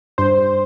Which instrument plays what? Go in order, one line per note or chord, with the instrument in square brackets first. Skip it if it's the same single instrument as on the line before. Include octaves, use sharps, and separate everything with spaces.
[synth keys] G2 C5